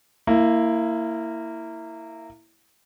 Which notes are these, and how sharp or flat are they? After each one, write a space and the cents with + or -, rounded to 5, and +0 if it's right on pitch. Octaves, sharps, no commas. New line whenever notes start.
A#3 -20 E4 +0